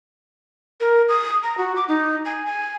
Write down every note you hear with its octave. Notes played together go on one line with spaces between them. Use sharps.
A#4
D#6
A#5
F#4
D6
D#4
G#5
G#5